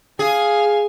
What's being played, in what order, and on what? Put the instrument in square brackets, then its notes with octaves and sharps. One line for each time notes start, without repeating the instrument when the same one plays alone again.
[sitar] G#4 [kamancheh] F5 G#5